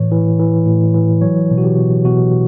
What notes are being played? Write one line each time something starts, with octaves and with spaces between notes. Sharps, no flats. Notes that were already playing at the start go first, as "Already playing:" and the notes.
Already playing: A2 E3 C#5
E3
E3
A2
E3
F#3 C#5
B2
F#4
G4
B2
B2 F#4